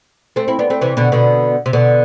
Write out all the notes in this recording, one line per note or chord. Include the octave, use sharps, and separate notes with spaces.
A3 C4
C4 E4
B3 D4
A3 C4
C3 E3
B2 D3
B2 D3
C3
B2 D3